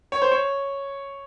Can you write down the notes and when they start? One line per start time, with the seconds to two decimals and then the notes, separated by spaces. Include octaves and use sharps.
0.12 C#5
0.22 C5
0.31 C#5